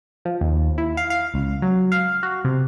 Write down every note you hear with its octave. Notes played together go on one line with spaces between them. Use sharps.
F3
D#2
E4
F5
F5
C#2
F#3
F5
F#4
C3